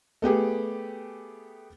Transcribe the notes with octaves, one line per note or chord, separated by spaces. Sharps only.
A3 B3 G4 G#4